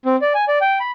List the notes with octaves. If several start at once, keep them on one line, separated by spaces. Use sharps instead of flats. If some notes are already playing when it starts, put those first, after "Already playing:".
C4
D5
G#5
D5
G5
B5